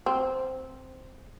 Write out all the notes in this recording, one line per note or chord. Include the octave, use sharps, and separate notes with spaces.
C4